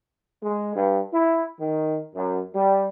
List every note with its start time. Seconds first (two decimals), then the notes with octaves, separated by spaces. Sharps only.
0.43 G#3
0.75 G2
1.13 E4
1.60 D#3
2.15 F#2
2.55 G3